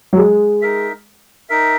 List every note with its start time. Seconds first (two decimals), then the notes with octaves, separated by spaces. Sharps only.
0.13 F#3
0.18 G#3
0.62 D#4 A#4 E5
1.49 D#4 A#4 E5